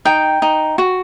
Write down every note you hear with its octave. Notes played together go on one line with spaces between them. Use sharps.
D#4 G5
D#4
F#4